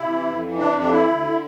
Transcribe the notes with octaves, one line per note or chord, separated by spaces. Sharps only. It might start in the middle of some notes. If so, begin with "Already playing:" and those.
Already playing: C3 E4
E3
F2
E3
C3 D4
F2 D4
E3 E4
D2
D3